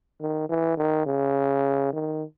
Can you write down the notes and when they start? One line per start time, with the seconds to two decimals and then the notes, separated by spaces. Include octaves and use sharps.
0.21 D#3
0.49 E3
0.77 D#3
1.06 C#3
1.93 D#3